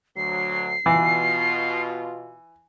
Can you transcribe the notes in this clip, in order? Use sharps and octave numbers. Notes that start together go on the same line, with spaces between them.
D2 F#3 C7
B2 E3 F4